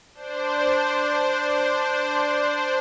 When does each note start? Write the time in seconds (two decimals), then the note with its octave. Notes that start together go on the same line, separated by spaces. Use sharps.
0.14 D4 C5